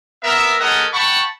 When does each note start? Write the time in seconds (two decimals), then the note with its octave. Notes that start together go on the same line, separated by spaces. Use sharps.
0.23 B3 A#4 E5
0.60 G#3 C#4 A4 A#4 D#5 F#5
0.93 F#5 G5 A5 B5 C#6